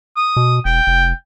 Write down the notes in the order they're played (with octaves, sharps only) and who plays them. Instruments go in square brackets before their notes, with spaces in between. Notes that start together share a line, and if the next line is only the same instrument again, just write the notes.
[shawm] D#6
[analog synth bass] B2
[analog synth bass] E1 [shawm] G5
[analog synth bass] F1